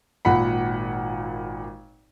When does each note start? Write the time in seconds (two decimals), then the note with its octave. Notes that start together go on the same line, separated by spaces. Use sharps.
0.25 G#1 A#2 F#5 B5